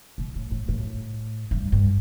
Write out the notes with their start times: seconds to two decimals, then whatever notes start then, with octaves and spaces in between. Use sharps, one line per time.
0.18 B2
0.35 A2
0.51 A2
0.69 A2
1.51 G2
1.72 G2